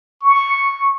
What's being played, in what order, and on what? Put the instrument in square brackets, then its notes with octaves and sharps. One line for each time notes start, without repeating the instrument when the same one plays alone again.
[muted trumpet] C#6